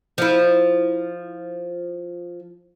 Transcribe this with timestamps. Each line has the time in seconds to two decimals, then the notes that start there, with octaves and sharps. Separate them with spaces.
0.18 F3 E4